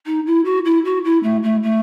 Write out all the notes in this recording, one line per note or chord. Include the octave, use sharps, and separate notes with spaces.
D#4
E4
F#4
E4
F#4
E4
A3
A3
A3